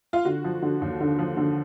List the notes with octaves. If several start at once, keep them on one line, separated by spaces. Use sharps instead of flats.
F4
D3 F#4
F3
D3
D#2
D3
F3
D3